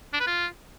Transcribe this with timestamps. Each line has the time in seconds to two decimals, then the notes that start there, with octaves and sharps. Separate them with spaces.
0.13 D4
0.20 B4
0.27 F4